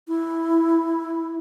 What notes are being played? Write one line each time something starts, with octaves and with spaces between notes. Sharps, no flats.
E4